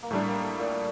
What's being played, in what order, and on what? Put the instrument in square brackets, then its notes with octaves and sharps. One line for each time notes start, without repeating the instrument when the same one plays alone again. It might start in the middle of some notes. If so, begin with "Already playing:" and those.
[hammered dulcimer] A#3
[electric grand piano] A2 G3 D4 [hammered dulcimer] A3
[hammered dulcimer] A#3
A3
A#2